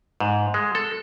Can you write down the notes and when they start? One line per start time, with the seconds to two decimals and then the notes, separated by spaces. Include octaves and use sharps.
0.20 G#2
0.54 G#3
0.75 A4